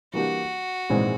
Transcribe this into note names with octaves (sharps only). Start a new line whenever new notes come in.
E3 G3 A#3 D4 F#4 G4
A#1 G#2 E3 G#3 C4